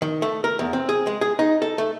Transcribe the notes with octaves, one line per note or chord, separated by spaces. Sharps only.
D#3
A3
A#4
E2
C4
G#4
G#3
G#4
D#4
A4
A3